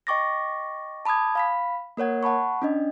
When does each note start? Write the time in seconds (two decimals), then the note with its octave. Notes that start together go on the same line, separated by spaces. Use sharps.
0.07 D#5 G5 C#6 D6 A6 A#6
1.05 A5 B5 D6 D#6 G#6
1.35 F5 B5 B6
1.97 A#3 A#4 C#5 F#5 G#6
2.23 F#5 A5 B5 C#6
2.62 C#4 D4 D#5